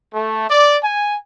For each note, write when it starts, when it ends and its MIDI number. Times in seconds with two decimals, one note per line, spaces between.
0.13 0.45 57
0.48 0.78 74
0.83 1.16 80